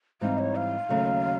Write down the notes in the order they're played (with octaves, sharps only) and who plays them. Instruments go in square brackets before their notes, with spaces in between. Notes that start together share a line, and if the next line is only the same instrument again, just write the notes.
[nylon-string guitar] G#2 E3 G3 C4 D#4 [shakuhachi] F5
[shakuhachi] C#5
F5
[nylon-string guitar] D#2 C#3 F#3 A3